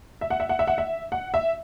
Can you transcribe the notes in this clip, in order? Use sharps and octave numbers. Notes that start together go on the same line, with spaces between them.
E5
F#5
E5
F#5
E5
F#5
E5
F#5
E5